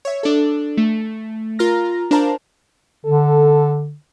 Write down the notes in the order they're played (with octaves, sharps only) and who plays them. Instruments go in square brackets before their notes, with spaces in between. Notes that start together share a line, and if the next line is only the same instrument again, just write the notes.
[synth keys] C#5 E5
D4 A4
A3
F4 A#4 A#5 F6 A#6
D4 A#4 C5 F5 A5 A#5
[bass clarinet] D3 [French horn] A4